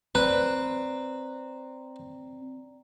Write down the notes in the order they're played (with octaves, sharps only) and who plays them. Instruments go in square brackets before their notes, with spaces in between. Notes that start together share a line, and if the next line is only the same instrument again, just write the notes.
[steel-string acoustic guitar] C4 [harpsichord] B4 [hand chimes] D5 A#5